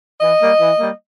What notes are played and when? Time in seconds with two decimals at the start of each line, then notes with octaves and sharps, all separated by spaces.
0.21 E3 D#5
0.40 G3 A#3
0.60 E3
0.79 G3 A#3